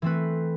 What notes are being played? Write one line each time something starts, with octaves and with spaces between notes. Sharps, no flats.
E3 A3 C4 B4